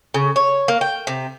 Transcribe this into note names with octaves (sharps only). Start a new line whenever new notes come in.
C#3
C#5
A#3
G5
C3